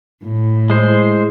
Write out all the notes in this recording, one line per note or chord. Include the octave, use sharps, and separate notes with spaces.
A2
G#3 E4 C5